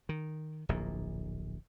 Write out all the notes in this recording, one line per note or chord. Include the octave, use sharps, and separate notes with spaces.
D#3
D1 A#1 A#2